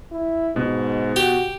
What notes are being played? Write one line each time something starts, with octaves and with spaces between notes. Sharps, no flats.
E4
G#2 B2
F#4 G4